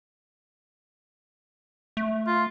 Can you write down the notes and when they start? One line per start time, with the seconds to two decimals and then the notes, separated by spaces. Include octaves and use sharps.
1.97 A3
2.27 F4